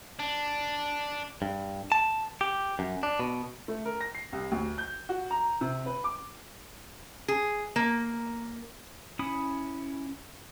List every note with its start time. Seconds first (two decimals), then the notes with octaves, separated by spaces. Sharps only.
0.19 D4
1.42 G2
1.92 A5
2.41 G4
2.79 F#2
3.03 D4
3.20 B2
3.68 A3
3.85 A#4
4.01 A#6
4.15 C7
4.33 C2
4.52 D2
4.78 G6
5.09 F#4
5.31 A#5
5.61 C3
5.86 B4
6.04 D6
7.28 G#4
7.76 A#3
9.19 C#4 E4 B5 D#6